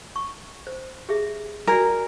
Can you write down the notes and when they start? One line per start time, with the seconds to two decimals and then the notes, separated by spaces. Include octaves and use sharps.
0.16 C#6
0.67 C5
1.09 G4 G#4 E5
1.67 F#4 A#4 D5 G#5